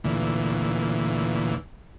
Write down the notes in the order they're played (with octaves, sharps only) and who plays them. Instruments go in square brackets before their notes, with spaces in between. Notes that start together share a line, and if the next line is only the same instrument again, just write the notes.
[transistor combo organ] D2 A#2 E3